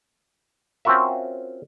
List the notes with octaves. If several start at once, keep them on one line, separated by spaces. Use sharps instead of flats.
C4 C#4 F4 F#4 A#4 E5